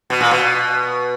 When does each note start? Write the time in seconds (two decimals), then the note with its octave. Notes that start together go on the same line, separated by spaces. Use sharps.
0.10 B2
0.21 A#2
0.31 B2